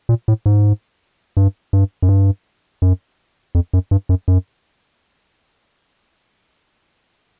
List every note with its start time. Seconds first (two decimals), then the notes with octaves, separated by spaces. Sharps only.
0.09 A#2
0.28 A2
0.46 G#2
1.37 G2
1.73 G2
2.02 F#2
2.09 G2
2.82 F#2
3.55 F2
3.73 F#2
3.91 G2
4.09 F#2
4.28 F#2